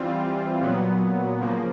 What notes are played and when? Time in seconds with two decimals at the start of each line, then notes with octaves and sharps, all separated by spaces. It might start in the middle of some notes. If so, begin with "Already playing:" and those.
Already playing: E3 G3 C4 F4
0.61 A#2 F#3 B3
1.40 C#3 F3 A#3